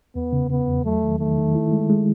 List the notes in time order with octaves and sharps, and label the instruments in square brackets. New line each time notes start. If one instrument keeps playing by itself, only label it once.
[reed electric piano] E2 [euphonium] B3
[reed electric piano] C#3
[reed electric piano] C#3 [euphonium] B3
[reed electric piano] E2
[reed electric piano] F#3 [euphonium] A3
[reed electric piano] D#3
[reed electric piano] D#3 [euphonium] A3
[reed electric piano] D#3
E4
G#3
G#3